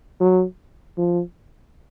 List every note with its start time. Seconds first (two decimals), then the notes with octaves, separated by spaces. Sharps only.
0.20 F#3
0.98 F3